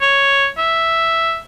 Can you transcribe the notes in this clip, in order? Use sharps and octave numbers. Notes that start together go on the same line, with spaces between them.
C#5
E5